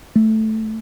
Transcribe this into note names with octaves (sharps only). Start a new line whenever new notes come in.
A3